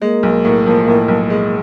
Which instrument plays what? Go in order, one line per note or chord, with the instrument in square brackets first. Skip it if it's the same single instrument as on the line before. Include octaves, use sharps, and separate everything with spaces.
[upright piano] G#3 [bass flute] A#3
[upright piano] B1
A2
F3
A2
B1
G#3